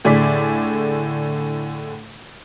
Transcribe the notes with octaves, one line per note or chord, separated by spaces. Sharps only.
A2 D3 G#4 D5 D6 B6